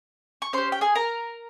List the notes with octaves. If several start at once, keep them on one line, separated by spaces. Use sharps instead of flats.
C#6
C#4 G4 C5 C6
G5
G#4 G#5
A#4 A#5